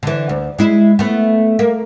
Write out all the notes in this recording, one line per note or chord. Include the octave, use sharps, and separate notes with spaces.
D3 E3
D2
G#3 E4
A3 B3
A#3